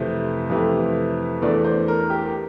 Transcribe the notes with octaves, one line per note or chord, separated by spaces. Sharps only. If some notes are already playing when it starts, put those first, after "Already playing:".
Already playing: F2 C3 E3 A3 C5
F2 C3 E3 A3
E2 E3 A3 D4 D5
C5
A#4
G4